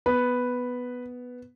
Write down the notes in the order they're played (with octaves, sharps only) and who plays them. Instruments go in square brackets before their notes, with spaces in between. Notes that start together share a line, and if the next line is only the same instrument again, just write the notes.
[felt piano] B3 [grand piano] B4